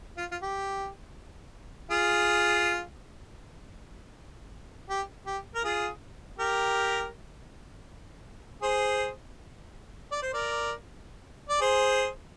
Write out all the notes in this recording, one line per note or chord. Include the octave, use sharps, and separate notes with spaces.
F4
F4
G4
F4 G#4
G4
G4
A#4
F4 G#4
G4 A#4
G#4 C5
D5
C5
A#4 D5
D5
G#4 C5